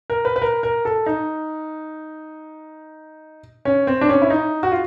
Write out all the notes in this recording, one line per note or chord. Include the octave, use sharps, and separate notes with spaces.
A#4
B4
B4
A#4
A#4
A4
D#4
C#4
C4
D4
C#4
E4
D#4
F#4
F4